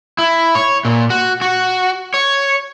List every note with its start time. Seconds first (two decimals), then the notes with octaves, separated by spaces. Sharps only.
0.18 E4
0.55 C#5
0.85 A#2
1.10 F#4
1.41 F#4
2.14 C#5